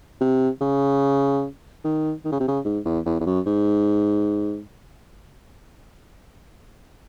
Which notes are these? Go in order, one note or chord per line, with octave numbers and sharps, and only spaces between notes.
C3
C#3
D#3
D#3
C#3
C3
C#3
G#2
E2
E2
E2
F#2
G#2